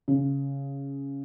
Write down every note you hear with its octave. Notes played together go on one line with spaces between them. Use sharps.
C#3